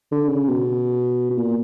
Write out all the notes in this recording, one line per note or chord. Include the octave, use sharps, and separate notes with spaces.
D3
C#3
B2
B2
A#2